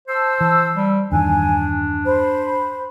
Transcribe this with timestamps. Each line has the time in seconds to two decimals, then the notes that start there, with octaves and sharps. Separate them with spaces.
0.08 C5 A5 E6
0.41 E3
0.76 G3
1.12 E2 G2 D#3 D4 G#5
2.06 C5 B5